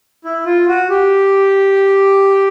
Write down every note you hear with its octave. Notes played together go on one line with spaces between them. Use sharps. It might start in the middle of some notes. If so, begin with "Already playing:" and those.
E4
F4
F#4
G4